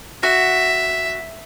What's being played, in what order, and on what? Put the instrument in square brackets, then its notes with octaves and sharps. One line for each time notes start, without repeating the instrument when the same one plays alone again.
[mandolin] F#4 [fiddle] E5